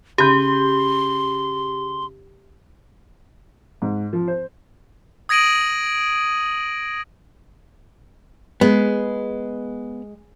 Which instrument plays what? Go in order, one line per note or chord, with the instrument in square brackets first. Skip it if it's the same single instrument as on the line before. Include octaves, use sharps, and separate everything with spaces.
[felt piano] C#3 B5 G6 [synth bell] G4 [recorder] C6
[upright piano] G#2
F3
C5
[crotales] D#6 G#6 A#6 D7 D#7 F#7
[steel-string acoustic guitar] G#3 [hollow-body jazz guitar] B3